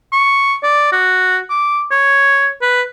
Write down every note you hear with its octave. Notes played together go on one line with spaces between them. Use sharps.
C#6
D5
F#4
D6
C#5
B4